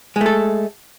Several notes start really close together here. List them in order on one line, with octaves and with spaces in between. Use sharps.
G#3 A3 A4